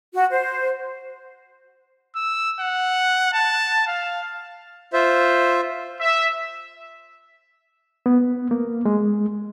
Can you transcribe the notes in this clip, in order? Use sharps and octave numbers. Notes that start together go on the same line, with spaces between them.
F#4
C5
E6
F#5
A5
F5
F4 C5 E5
E5
B3
A#3
G#3